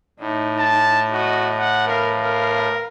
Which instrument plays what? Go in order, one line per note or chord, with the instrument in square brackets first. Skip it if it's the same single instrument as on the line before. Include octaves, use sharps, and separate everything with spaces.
[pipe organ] A2 [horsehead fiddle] D#4 D#5
[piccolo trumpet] A5
[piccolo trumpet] F#4 [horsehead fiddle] D#5
[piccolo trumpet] F#5
[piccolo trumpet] A#4 [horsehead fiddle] B4 F5
[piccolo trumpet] A#4